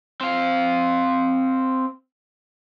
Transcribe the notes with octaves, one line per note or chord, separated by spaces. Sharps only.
C4 F5